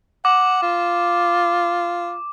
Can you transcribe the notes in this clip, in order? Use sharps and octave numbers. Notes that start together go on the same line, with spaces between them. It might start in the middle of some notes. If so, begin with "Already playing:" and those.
F#5 D6
F4